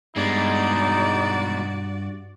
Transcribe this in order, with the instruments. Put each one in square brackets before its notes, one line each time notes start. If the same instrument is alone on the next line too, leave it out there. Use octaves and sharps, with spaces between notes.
[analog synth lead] G2 [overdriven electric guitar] B2 G#3 [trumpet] D#4 [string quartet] F#4 D5